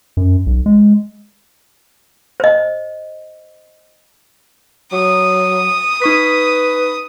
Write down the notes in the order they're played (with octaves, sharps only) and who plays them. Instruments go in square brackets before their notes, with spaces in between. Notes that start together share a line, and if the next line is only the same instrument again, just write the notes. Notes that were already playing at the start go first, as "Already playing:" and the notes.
[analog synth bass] F#2
B1
G#3
[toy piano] C5 D#5
[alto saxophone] F#3 [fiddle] D#6
[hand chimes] D#4 C#6 B6 [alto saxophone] B4